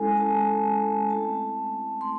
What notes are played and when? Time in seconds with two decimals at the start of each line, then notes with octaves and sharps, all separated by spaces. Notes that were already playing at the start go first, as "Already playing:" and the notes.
Already playing: G#3 C#4 E4 A4 G#5
0.17 G#3 C#4 E4 A5
1.10 A3 C4 E4 A5
2.01 A3 C4 C6